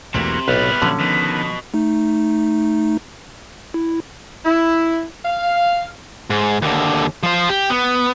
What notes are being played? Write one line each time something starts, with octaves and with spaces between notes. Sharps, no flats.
B1 E2 C3 E3 A3 A#3 F#4
B1 A2 C3 G3 B3 E4 B4 F6
A#2 D3 F3 F#3 C#4
B2 D#3 F3 B3
A3 D#4
E4
E4
F5
G#2
D#2 D3
F3 C5
G4
B3